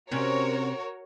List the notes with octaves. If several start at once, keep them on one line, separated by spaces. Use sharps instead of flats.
C3 C4 C#4 F#4 A#4 C#5